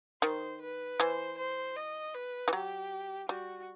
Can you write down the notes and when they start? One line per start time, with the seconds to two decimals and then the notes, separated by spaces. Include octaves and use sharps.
0.22 D#3 C5
0.61 B4
0.99 E3 C5
1.38 C5
1.76 D#5
2.14 B4
2.48 E3
2.52 F#3 G4
3.28 G3 F#4